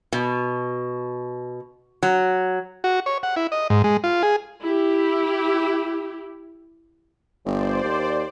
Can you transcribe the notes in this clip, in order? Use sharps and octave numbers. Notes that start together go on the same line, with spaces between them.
B2
F#3
F#4
C#5
F#5
E4
D#5
G#2
G#3
F4
G#4
E4 G4
G1 C5 D5
D#2